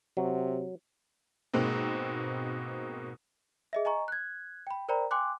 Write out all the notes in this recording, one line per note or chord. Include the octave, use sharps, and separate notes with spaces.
C3 F#3
G#2 B2 G#3 A#3 C4
G#4 D#5 E5
D#5 G#5 A#5 C#6
F#6 G#6
G5 B5
A#4 C5 D5 G5 A#5 B5
G5 G#5 C6 D6 F#6